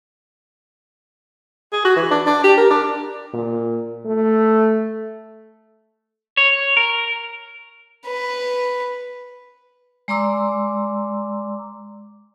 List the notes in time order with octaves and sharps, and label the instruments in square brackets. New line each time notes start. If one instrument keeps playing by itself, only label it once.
[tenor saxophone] G#4
F#4
E3
D4
D4
G4
A#4
D4
[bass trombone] A#2
A3
[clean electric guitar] C#5
A#4
[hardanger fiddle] B4
[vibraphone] G#3 D5 A#5 C6 D6 E6